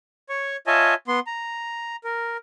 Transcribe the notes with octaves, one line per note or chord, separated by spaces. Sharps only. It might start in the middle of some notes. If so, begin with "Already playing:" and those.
C#5 C#6
F4 C#5 D#5 E5 G#5 A5
B3 C6
A#5
A#4